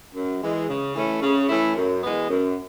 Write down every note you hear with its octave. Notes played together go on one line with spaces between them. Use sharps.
F#2
E3 G#3
C#3
E3 A3 C#4 E4
C#3
E3 A3 C#4 E4
F#2
E3 G#3 B3
F#2